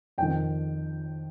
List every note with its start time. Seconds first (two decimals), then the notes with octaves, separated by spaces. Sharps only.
0.18 F2 D#3 G5